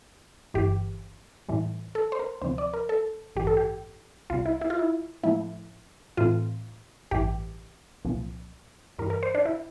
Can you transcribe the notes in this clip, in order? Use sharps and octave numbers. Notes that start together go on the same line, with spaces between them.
G1 G2 E3 G4
A2 E3 G3
A4
C5
A#4
D2 C3 F3 C5
D5
A#4
A4
A1 G2 E3 G4
A4
G4
C2 C3 G3 F4
E4
E4
F4
E4
A2 F3 A3 E4
A2 E3 A3 C4 F4
A1 G2 E3 G4
C2 A#2 F3
G2 E3 G3 A#4
A#4
C5
D4
E4